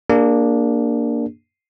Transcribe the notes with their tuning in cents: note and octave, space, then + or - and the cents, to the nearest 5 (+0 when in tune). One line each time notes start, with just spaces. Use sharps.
A#3 +0 D4 +0 G#4 -35